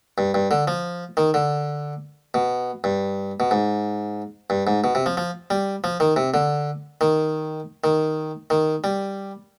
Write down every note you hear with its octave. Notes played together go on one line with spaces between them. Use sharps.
G2
G2
D3
F3
D#3
D3
B2
G2
B2
G#2
G2
G#2
B2
C3
F3
F3
G3
F3
D#3
C3
D3
D#3
D#3
D#3
G3